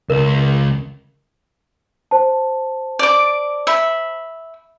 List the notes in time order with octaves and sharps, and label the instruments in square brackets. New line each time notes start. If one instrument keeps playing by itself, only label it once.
[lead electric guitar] C#2 [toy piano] A#4
[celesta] C5 A5
[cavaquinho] D5 D6
E5 B5